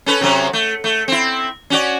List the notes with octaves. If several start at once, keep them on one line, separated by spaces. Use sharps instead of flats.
C#4 A4 B4
C3 F#3 C#4
A3
A3
C4 E4
C#4 F#4 D5